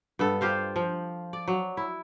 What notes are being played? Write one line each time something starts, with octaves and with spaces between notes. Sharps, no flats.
G2 B3 A4
F4 G4 C5 F5
F3
D5
F#3
E4